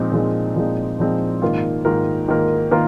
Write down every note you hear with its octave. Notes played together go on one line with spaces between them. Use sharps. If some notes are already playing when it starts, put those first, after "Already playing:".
Already playing: A#2 F3 G#3 C4 D#4
A#2 F3 G#3 C4 D#4
A#2 F3 G#3 C4 D#4
A#2 F3 G#3 C4 D#4
G#2 D#3 A#3 F4 A#4
G#2 D#3 A#3 F4 A#4
G#2 D#3 A#3 F4 A#4
D#3 A#3 F4 A#4